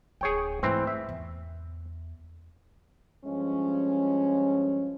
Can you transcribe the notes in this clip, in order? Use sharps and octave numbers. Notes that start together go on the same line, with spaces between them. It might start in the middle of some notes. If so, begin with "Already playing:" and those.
D1 C#4 G#4 C#5 G5
G#2 E3 A3 C4
E5
E2
G2 F3 G#3 C#4